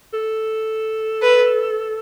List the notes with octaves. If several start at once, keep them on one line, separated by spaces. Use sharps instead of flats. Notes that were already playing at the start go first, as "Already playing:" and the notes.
A4
B4